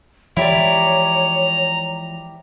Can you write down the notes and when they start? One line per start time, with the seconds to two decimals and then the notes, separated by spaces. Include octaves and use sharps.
0.37 E3 F3 G#3 E4 G4 C#5 D5 A#5